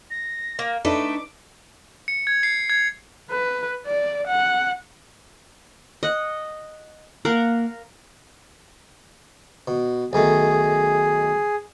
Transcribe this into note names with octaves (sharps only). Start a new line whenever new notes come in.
A#6
A#3
A3 D4 D#4 A4 B4 D6
C#7
G#6
C7
G#6
B4
D5
F#5
D#5 F#5
A#3 A#4 F5 F#5
B2
B1 D#3 A3 G#4